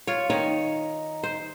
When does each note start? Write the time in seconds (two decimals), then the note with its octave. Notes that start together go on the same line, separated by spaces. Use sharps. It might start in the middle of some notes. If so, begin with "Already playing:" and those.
0.07 F4 C#5
0.30 D#3 D#4 C#5
1.23 C5